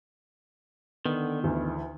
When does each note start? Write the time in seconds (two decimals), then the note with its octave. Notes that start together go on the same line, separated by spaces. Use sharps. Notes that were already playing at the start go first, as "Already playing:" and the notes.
1.06 D3 D#3 B3
1.44 D2 E3